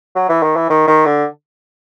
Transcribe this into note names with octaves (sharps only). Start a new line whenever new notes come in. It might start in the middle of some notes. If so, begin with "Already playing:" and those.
F#3
E3
D#3
E3
D#3
D#3
D3